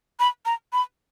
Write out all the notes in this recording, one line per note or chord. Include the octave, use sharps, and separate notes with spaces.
B5
A#5
B5